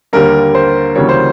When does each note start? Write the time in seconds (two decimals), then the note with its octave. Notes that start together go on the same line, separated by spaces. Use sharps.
0.13 D#2 D3 G3 A#3 A#4
0.55 C5
0.95 D2 C#3 E3 G3 A#3 C#5
1.09 C5